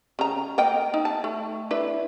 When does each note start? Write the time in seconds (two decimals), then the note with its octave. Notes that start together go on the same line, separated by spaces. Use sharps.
0.19 C#3 A#5
0.58 A#3 D#5 G5
0.94 D#4
1.05 A5
1.24 A3
1.71 D4 E4 B4